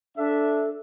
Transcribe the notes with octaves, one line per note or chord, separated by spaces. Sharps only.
D4 A4 E5